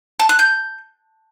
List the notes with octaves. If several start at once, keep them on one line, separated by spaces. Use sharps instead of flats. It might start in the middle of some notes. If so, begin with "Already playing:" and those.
A5
F#6
G6